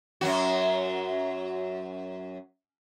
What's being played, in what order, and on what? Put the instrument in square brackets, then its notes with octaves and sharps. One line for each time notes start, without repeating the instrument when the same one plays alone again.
[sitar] F#2 F#3 F#4